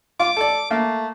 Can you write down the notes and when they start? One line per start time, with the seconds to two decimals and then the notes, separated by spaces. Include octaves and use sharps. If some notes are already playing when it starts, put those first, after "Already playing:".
0.20 F4 D6
0.37 A4 D5
0.71 A3 A#3